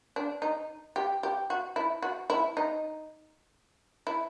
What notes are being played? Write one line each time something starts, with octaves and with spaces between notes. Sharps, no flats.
D4
D#4
G4
G4
F#4
E4
F#4
E4
D#4
E4